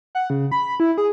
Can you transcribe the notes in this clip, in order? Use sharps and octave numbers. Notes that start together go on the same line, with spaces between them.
F#5
C#3
B5
E4
G#4